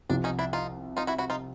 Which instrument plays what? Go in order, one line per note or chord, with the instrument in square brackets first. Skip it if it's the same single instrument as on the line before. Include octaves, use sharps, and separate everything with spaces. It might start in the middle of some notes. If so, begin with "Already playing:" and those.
[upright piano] C2 C3 F3 [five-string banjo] D4
[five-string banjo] C#4 D#4
D4 E4
D#4 F4
D#4 F4
E4 F#4
E4 F#4
D#4 F4